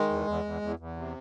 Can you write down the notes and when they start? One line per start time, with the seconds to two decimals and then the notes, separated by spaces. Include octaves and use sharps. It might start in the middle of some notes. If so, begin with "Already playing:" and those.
Already playing: D#3 G#3
0.09 E2
0.27 E2
0.45 E2
0.62 E2
0.79 E2
0.97 C3